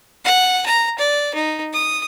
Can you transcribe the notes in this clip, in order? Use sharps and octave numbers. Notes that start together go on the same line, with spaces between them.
F#5
A#5
D5
D#4
D#6